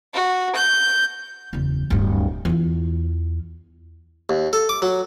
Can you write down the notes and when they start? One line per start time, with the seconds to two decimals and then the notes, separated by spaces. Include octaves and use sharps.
0.14 F#4
0.55 G6
1.53 F#1 E2
1.90 D1 G2
2.45 E2 F4
4.29 D#2
4.53 A4
4.69 D6
4.82 F#3